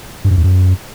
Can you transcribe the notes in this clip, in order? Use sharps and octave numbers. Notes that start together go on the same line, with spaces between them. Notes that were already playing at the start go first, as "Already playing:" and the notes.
G2
F#2
E2
F#2